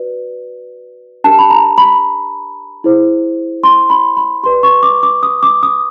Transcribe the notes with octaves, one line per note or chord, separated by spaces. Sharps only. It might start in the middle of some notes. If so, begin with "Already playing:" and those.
Already playing: F#4 B4 D5
D4 G4 A#4 A5
B5
A#5
B5
E4 G#4 C5
C6
B5
B5
G4 B4 D5 C6
C#6
D6
D6
D#6
D6
D#6